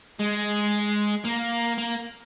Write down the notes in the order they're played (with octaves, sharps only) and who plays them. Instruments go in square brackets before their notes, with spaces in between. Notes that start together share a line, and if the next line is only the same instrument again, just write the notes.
[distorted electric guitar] G#3
A#3
A#3